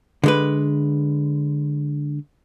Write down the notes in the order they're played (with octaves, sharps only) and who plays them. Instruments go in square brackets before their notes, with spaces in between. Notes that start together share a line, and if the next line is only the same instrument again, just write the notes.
[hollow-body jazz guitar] D3 G#3 B4